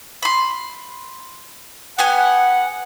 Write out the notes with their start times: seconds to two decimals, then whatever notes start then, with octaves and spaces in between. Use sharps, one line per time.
0.23 B5 C6
1.98 B3 G4 F#5 G#5